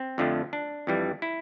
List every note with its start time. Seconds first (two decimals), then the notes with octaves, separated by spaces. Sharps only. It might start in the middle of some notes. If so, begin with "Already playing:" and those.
Already playing: C4
0.18 F2 D3 F3 A3
0.53 D4
0.87 F2 E3 G3
1.22 E4